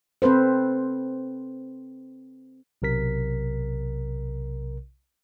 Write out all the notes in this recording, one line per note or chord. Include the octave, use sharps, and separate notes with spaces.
C4 A4 B4 C5
B1 C3 A#4 B6